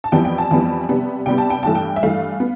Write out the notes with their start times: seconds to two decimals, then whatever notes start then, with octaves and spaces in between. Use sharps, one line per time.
0.04 A5
0.12 F2 E3 G3 B3 G5
0.25 G5
0.38 A5
0.51 F2 E3 G3 B3
0.89 C3 G3 B3
1.26 C3 G3 B3 G5
1.38 A5
1.50 G5
1.63 G2 E3 A3 A5
1.75 G5
1.96 E5
2.03 G2 E3 A3 F5
2.40 B3